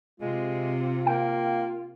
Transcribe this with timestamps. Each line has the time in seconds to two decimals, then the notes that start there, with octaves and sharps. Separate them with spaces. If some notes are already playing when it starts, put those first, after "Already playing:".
0.20 C3 G#3 F4
1.06 A#3 G5